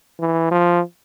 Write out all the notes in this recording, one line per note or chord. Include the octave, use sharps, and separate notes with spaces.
E3
F3